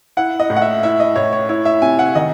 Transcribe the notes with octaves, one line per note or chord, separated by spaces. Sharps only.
E4 F#5
D#5
A2
F#5
E5
E4 E5
D#5
A2 C#5
C#5
E4 C#5
E5
C3 G#5
F#5
D#3 D#5